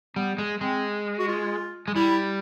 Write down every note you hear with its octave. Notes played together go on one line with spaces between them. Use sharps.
G3 B3
G#3
G#3 C4
F#4
F4
G#3
G3 E4